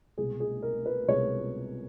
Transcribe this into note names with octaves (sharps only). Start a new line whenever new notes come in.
C2 B2 G#3 G#4
G#4
A#4
B4
C2 B2 G#3 C#5